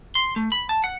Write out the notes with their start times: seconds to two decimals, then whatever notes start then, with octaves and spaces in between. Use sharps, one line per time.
0.15 C6
0.36 A3
0.52 B5
0.69 A5
0.84 F#5